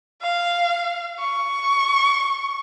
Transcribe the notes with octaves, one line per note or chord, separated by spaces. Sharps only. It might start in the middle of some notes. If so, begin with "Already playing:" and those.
F5
C#6